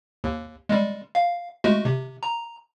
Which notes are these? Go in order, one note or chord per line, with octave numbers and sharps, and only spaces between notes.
D#2
G3 G#3
F5
G#3 A3 F#4
C3
A#5